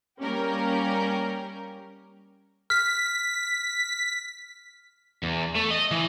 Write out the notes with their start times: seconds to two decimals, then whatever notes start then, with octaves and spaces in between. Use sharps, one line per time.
0.20 G3 A#3 C#4 G4 A#4
2.70 F6 B6
5.23 E2
5.55 A3
5.71 D#5
5.91 E3